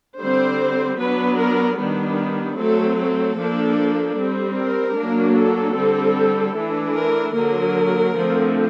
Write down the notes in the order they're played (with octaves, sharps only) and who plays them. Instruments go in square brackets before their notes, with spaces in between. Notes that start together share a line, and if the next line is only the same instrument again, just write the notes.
[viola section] D3 G3 C4 C5
F#3 B3 D4 B4
A#4
D#3 G3 B3 D4
F#3 A3 C4 A4
A4
F3 A#3 D4
G3 C4
A#4
F#3 A#3 D4
A4
D3 G3 C4
E3 A3 D4
A#4
D3 F#3 A#3 A#4
D3 F3 A3 C4